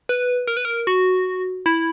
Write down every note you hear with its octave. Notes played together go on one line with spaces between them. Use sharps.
B4
A#4
B4
A#4
F#4
E4